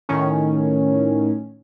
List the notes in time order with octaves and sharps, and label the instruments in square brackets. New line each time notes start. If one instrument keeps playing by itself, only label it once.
[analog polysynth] A2 D#3 C#4